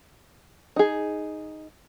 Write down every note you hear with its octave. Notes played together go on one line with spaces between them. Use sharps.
D#4 G#4